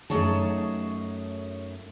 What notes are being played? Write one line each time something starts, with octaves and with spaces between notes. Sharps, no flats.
F#2 A3 D#4 G#4 C#5 A5